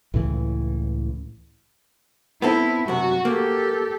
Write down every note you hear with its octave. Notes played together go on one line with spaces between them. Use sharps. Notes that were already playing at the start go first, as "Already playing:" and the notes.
C#2 A2 C#3 E3
B3 C4 E4 A4
F#2 C3 F#4
A#3 G4 A4